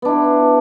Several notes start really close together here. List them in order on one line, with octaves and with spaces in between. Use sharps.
B3 D4 E4